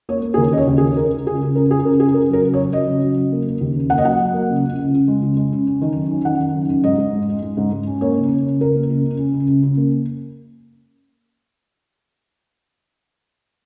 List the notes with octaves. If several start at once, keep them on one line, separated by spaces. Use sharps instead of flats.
A#3 C#5
A#3
G#4
D#2 A#4
C#3 D#5
C#5
D#2
G#4
C#3
C#3 A#4
C#2
C#2 G#4
C#2
C#2 A#4
C#4 G#4
C#3 A#4
C#3 G#4
C#2 A#4
F#3 A#4
C#3
C#5
F#3
F#3 D#5
C#3
F#3
C#3
A#3
A#3
D#2
C#3
A#3 F#5
D#5
F#3 F#5
F#3
A#3
C#2
C#2
C#2
C#2
G#3
C#2
G#3
C#3
C#4
D#3
F#2
C#4
D#3 F#5
D#3
F#2
F#2
G#2 D#5
G#2
G#3
G#3
G#3
G#2
G#2
C#4
A#3 C#5
C#3
C#3
C#3
C#2 A#4
A#3
C#2
C#2
C#4
C#3
C#2
C#3
A#3